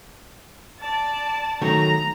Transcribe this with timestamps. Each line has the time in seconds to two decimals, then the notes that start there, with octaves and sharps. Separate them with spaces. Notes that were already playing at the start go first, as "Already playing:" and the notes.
0.80 D5 A5
1.62 D#3 F#3 A3 A#5